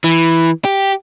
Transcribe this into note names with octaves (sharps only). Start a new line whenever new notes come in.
E3
G4